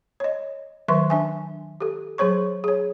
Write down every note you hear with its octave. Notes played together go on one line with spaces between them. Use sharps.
C#5 D#5
D#3 F#3 B4 E5 C6 C#6
D4 E5 G#5
G4 A4
F#3 G#4 C5 C#5 C#6
G#4 C#5